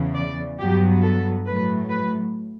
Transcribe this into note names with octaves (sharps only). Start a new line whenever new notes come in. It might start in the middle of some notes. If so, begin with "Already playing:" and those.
Already playing: E2 C#3 E3
D5
G2 F#3 B3 G4
A4
A2 F#3 A3 B4
B4